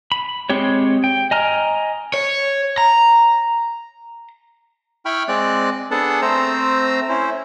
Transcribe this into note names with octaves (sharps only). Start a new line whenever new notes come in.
B5
G#3 C4 G4 C#5
G5
D#5 G#5 A#5 F6
C#5
A#5
E4 G5 B5 C#6 F6
G#3 C4 D5 F#6
B3 D4 G#4 A4 F#5 A5
A3 C4 C5 A#5 E6
C#4 E4 C5